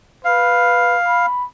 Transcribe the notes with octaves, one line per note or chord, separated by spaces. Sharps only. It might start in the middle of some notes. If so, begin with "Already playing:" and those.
B4 F5
B5